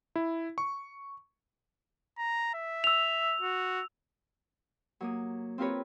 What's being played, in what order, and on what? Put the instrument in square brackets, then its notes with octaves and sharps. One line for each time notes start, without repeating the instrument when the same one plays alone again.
[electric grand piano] E4
C#6
[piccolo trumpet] A#5
E5
[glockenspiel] E6 F7
[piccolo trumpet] F#4
[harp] F#3 A#3 D#6
C4 F4 G4 A#4 B4 C#5